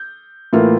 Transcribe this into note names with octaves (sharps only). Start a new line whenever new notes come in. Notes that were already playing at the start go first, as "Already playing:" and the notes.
Already playing: G6
A2 E3 A#3 F4